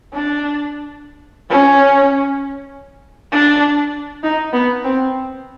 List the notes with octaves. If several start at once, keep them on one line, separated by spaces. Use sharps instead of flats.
D4
C#4
D4
D#4
B3
C4